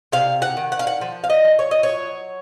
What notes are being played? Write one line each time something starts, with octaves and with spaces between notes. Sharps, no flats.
C3 F5
F#5
D#3
F#5
F5
F#5
F3
F5
D#5
F3
C#5
D#5
C#5
F#3